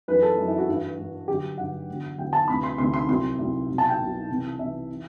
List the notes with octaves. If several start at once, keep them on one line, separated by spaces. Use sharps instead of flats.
F#2 E3 B4
A4
F#2 E3
E4
F#4
G2 E3
G2 E3
G2 D3 F#3 G4
G2 D3 F#3 F#5
E2 D3 F#3
E2 D3 F#3 G5
A5
D2 C3 E3 B5
C6
D2 C3 E3 C6
C6
C2 C3 F#3 C6
C2 C3 F#3
C2 B2 F#3
A5
G5
C2 B2 F#3
C2 C3 E3
C2 C3 E3 E5
E3